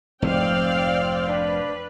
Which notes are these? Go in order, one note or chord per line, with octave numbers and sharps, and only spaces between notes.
F1 G#2 C4 D5 F5 G5
D4 B4